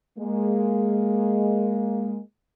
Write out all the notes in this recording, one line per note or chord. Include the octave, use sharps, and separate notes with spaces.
G#3 A#3